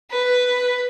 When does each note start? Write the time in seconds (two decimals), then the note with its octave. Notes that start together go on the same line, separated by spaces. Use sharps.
0.11 B4